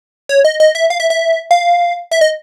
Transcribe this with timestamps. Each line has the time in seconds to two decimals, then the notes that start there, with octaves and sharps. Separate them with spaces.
0.29 C#5
0.45 D#5
0.60 D#5
0.75 E5
0.90 F5
1.00 E5
1.10 E5
1.51 F5
2.11 E5
2.21 D#5